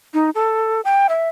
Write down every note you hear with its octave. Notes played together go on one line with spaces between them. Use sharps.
D#4
A4
G5
E5